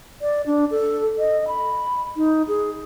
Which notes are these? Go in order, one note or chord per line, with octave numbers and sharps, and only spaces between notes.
D5
D4
A4
D#5
B5
D#4
G#4